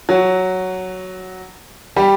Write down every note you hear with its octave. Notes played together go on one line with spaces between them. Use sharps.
F#3 F#4
G3 G4